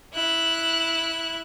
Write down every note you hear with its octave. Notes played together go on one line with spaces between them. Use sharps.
E4 F#6